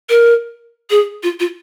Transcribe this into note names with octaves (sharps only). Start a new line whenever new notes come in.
A#4
G#4
F4
F4